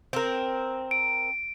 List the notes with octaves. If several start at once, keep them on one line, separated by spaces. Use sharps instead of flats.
C4 A#4
D7